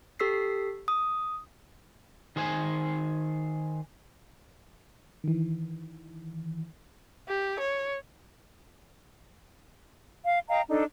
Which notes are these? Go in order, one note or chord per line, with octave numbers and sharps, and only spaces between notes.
G4 A4 E6 B6 C7
D#6
D#3 G#4 C5 F5 G#5
D#3 E3
G4
C#5
F5
D#5 F5 G5 A#5
D4 D#4 A4